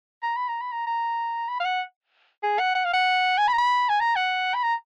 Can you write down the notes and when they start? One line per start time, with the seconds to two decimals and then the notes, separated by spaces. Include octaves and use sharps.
0.23 A#5
0.36 B5
0.48 A#5
0.61 B5
0.72 A#5
0.86 A#5
1.48 B5
1.60 F5
1.64 F#5
2.43 G#4
2.59 F#5
2.75 F#5
2.84 F5
2.93 F#5
3.38 G#5
3.48 B5
3.53 A#5
3.58 B5
3.89 G#5
4.00 A#5
4.16 F#5
4.54 B5
4.63 A#5